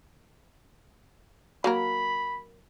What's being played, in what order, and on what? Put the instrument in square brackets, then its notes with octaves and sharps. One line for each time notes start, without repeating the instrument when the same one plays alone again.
[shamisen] F#3 A#3 A#4 [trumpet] B5